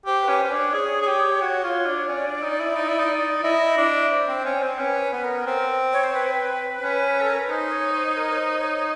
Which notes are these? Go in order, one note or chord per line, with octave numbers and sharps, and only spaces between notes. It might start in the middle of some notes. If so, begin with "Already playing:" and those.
G4 C5
B4
C#4
C#4 C5
D4
C#5
G#4
G#4
G4
F#4
F4
D4
C#4 D5
D4
D#4
E4
D#4
E4
D#4
E4 D#5
D#5
D4
E5
C5
C4
C#4
C4
C#4 B4
B4
B3 B4
A#4
C4
C#5
C5
B4
C#4
A4
A#4
B4
D#4 C5
C#5
C5
A#4
C#5
C5
C#5